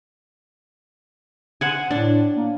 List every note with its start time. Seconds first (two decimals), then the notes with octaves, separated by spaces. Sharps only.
1.61 C5 F#5 G#5
1.91 A2 D4
2.36 A#3